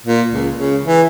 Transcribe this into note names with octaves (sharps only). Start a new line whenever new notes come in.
A#2
C#2
C#3
E3